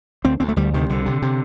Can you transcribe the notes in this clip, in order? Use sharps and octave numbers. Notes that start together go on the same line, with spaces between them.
D2 C4
D2 C4
A3
D2 G3
C3 D#3
C2 D3
C3
C3